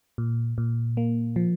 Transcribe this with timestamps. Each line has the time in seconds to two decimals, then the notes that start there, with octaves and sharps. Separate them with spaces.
0.18 A#2
0.58 A#2
0.97 A#3
1.36 F3